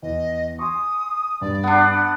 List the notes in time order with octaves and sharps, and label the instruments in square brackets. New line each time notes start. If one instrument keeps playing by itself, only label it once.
[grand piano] E2 [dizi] D#5
[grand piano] G#5 C6 C#6 [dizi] D#6
[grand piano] G2 [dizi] D5
[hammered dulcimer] B3 D4
[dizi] F#5